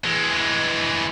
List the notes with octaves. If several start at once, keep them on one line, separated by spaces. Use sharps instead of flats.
E3 G#3